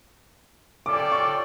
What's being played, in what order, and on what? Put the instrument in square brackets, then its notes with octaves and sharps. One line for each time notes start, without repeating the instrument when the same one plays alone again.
[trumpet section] C#4 F4 A4 D5 G5 [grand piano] D6
[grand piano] C#6